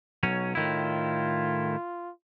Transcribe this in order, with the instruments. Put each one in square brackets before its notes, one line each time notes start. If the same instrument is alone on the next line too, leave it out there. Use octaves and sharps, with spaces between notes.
[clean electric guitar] B1 F#3 C#4
[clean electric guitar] A2 D#3 E4 [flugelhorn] F4